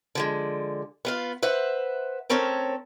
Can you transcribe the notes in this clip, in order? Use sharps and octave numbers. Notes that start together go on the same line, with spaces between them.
D3 F3 G#3
B3 F4 F5
B4 C5 E5 F#5
A3 C4 C#4 A4 A#4 C#5